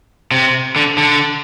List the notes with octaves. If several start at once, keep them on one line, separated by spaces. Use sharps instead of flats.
C3
D3
D3